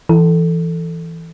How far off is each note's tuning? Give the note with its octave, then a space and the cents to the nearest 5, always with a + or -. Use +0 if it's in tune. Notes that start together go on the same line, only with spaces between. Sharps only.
E3 +0 A4 +0